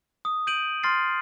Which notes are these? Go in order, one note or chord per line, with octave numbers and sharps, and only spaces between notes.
D#6
G6 D7 D#7 F#7
C6 F6 A6 C7